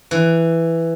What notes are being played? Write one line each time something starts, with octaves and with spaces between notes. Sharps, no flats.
E3